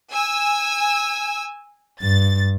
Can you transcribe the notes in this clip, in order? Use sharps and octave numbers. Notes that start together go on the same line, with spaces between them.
G#5 E6
G2 A6